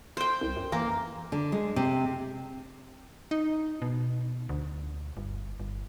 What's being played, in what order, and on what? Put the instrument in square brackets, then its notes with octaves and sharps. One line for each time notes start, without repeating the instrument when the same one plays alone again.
[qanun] C5 G5
[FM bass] C2
F#2
[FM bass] E3 [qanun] A#3
[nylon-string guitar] D3
G#3
C3
[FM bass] D#4
B2
D2
G1
G1